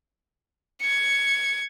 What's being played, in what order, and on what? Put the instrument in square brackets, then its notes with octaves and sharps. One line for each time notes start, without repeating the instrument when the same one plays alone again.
[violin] G#6 C#7